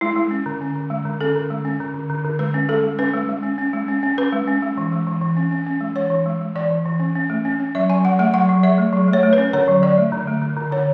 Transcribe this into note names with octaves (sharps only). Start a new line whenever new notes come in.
G#3 E4
G#3
C#4
D3
C#4
D3
G#3
D3
C#4 A4
D3
G#3
C#4
D3
D3
D3
D3
G#3 B4
C#4
G#3 A4
G#3
C#4 B4
G#3
G#3
C#4
C#4
G#3
C#4
C#4
C#4 B4
G#3
C#4
G#3
E3
G#3
E3
E3
C#4
C#4
C#4
G#3
E3 C#5
E3
G#3
G#3
E3 D5
E3
E3
C#4
C#4
A3
C#4
C#4
F#3 E5
F#3 G#5
F#3 F#5
A3 F#5
F#3 F#5
F#3
F#3 E5
A3
F#3
A3
C#5
A3
B4
C#4
D3 C#5
F#3
F#3 D5
A3
D3
A3
D3
D3
D3 C#5